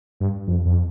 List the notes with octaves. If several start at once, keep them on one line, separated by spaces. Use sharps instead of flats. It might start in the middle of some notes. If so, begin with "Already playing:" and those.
G2
F2
F2